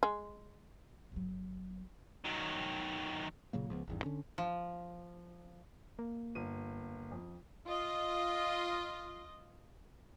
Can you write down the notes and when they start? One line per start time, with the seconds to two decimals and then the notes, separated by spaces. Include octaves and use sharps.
0.03 G#3
1.12 G1 F#3
2.24 D#3 F#3
3.53 A#2 C#3 F#3 A#3
3.70 C#2 F3 B3
3.87 G#1 E2 G2
4.03 D3 C#4 D4
4.38 F3
5.99 A#3
6.35 G1 D#7
7.12 F2
7.67 F4 D#5